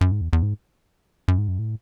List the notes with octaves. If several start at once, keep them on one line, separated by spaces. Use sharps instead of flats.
F#2
G#2
E2
E2
G#2
F#2
G#2
F#2
A2